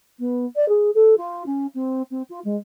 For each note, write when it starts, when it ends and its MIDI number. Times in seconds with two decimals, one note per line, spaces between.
0.19 0.45 59
0.55 0.68 74
0.68 0.90 68
0.94 1.17 69
1.17 1.43 65
1.46 1.66 61
1.74 2.02 60
2.10 2.22 60
2.29 2.39 65
2.44 2.56 56